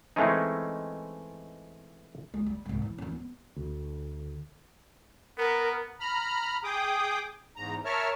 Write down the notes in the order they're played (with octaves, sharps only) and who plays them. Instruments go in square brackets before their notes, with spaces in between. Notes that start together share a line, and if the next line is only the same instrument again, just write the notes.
[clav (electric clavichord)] E3 G#3 A3 C4 C#4 D#4
[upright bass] G#3
G3
C2 G#2
E3
E3 C#4
B3
[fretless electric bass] D2
[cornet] B3 [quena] A#4
[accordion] A#5 B5 F6
G#4 G5 D6 D#6
E2 G#2 A#5
A#4 C#5 E5 A5 F6